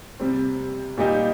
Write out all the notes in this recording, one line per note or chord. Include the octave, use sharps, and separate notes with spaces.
C3 G3 C4
A#2 G3 D#4 G4